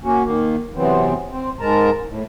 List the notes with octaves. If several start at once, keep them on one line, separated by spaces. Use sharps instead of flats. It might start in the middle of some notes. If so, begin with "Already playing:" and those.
A#3 C#4 F#4
D#3 A#3
C3 E3 F#3 B3 C4
C4
G#2 G#3 A#4 A5 A#5
A2